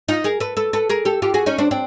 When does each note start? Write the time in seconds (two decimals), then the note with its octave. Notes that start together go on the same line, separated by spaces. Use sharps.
0.08 D#4 F4
0.24 G#4 A#4
0.40 A4 B4
0.57 A4 B4
0.73 A4 B4
0.90 G#4 A#4
1.05 G4 A4
1.22 F4 G4
1.34 F#4 G#4
1.46 C#4 D#4
1.58 C4 D4
1.71 C4 D4